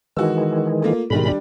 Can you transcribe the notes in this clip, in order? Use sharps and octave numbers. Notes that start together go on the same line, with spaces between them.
D#3 E3 G#3 F#4 E6
A3 A#3 F4
G#2 B2 D#3 G3 G#3 B5
G3 D4